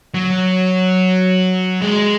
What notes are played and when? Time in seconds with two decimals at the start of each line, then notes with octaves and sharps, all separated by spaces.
0.14 F#3
1.82 G#3